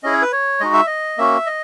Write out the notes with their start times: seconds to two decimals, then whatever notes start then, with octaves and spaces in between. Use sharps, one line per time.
0.03 C#4 E4 G#4 D#5
0.13 C#5
0.22 B4
0.32 C#5
0.60 G#3 D#4 F#4 D#5
0.73 E5
0.87 D#5
1.18 A#3 C#4 F#4 E5
1.46 D#5